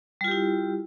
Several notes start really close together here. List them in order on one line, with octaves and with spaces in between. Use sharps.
G3 F4 G4 E4